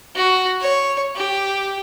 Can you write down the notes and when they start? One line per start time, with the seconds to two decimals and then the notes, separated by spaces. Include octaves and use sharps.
0.16 F#4
0.61 C#5
1.16 G4